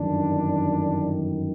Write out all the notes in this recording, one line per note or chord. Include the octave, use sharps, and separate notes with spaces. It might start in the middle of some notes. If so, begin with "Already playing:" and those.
Already playing: G1 F#2 D#3 D4